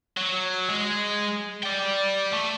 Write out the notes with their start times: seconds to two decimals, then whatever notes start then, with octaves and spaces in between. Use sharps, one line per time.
0.17 F#3
0.69 G#3
1.63 D5 G5
2.33 A3